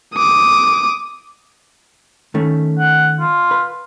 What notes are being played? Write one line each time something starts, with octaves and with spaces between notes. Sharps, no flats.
D6 D#6
D#3 A3 C#4
F#5
F4
B4